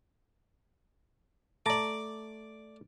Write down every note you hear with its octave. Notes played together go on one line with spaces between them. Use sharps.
A3 D5 A5 A#5 D6